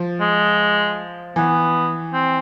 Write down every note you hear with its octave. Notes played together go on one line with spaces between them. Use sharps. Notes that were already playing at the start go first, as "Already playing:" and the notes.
Already playing: F3
G#3
E3 B3
C4